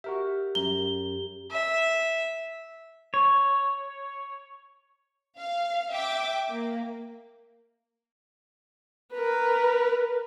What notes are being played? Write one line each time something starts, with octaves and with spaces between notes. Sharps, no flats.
F#4 G4 A#4 E5
F#2 A#5 G7
E5
C#5
F5
E5 G5 D6
A#3
A#4 B4